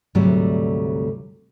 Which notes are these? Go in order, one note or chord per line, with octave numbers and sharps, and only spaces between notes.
D2 G#2 C3 F#3 G3 A3